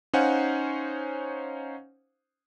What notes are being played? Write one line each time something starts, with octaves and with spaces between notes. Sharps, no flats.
C#4 D#4 C5 F5 F#5 G#5